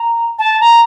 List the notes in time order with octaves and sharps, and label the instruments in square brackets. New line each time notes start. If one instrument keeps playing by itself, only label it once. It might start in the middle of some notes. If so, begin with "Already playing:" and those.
Already playing: [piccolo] A#5
A5
A#5